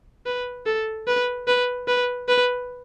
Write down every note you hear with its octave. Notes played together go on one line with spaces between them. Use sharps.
B4
A4
B4
B4
B4
B4